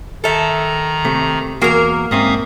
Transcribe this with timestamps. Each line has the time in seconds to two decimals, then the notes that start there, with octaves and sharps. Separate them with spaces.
0.24 D#3 A4 E5 A#5
1.05 C3 A3
1.62 E2 A#3 F#4 G#4 A#4
2.11 G#2 C4 C#4 E5 F5 D#6